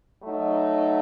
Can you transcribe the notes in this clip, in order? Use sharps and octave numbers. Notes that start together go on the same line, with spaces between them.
F#3 A3 D#4